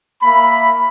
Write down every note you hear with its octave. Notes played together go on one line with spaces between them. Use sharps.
A#3 E5 B5